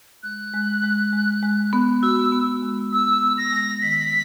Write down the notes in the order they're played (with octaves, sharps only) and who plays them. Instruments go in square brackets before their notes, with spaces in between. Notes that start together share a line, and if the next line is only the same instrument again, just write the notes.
[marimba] G#3 [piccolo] F#6
[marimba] G#3
G#3
G#3
G#3
B3
[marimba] F#4 [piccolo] E6
[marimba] B3
G#3
[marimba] B3 [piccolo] E6
[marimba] B3
[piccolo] A#6
[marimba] G#3
[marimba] D#3 [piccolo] B6